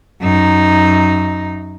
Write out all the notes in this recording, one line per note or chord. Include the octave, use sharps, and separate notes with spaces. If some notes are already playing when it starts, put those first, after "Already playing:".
F#2 D#4